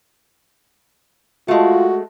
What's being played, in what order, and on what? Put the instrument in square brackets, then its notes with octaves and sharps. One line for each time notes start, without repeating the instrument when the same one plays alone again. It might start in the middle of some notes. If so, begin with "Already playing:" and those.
[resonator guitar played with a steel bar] G#3 A3 [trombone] F4 [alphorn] F#4